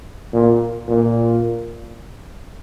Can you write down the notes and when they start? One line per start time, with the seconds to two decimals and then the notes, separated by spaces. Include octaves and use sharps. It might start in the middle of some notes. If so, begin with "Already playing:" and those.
0.33 A#2
0.88 A#2